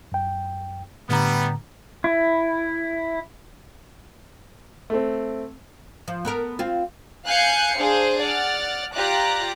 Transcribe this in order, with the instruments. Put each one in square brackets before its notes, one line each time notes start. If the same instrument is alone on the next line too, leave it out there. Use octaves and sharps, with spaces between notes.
[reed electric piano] F#2 G5
[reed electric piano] A2 D3 A#5 [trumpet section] G3 B3
[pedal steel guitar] E4
[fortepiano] A3 C4
[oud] F3
B3 A4 A#4
C4 F4
[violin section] F5 G#5 F#6 G6 C7 C#7
D4 G#4 C5 F5
D5 F#5 F6 A6
F4 G4 D5 A#5 D6 F#6